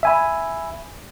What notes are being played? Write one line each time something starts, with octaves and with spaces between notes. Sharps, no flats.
E5 G#5 B5